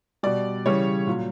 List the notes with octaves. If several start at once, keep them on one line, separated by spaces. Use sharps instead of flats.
B2 G3 D5
C#3 E3 G3 C#5
A#2 F#3